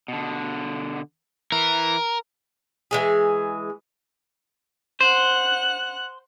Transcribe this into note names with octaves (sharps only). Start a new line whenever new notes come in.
B2 D3
E3 A#4
E3 G#3 G#4
C5 F#5 F#6